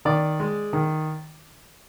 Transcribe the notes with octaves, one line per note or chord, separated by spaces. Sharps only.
D#3 D5
G#3
D#3